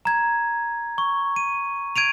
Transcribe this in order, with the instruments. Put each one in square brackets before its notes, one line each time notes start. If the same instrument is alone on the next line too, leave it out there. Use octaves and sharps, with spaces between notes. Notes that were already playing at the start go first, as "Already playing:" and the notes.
[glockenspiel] A#5 G#6
C#6
D#7
G#6 D7 D#7 F7